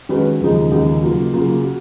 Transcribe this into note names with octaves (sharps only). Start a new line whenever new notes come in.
D#3 G#3 C#4 F#4 B4
D#2 C#3 F3 G#3 D#4
D#2 C#3 F3 G#3 D#4
C#3 F#3 A#3 F4
C#3 F#3 A#3 F4
F#4